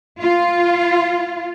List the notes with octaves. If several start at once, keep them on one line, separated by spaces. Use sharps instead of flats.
F4